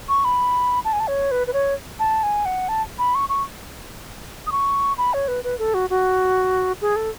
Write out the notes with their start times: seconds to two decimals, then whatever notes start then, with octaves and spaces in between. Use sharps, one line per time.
0.09 C#6
0.25 B5
0.85 A5
0.93 G#5
1.00 A5
1.08 C#5
1.31 B4
1.47 B4
1.53 C#5
2.00 A5
2.23 G#5
2.46 F#5
2.69 A5
2.99 B5
3.15 C#6
3.29 C#6
4.47 D#6
4.52 C#6
4.98 B5
5.14 C#5
5.28 B4
5.44 B4
5.59 A4
5.74 F#4
5.90 F#4
6.82 G#4
6.96 A4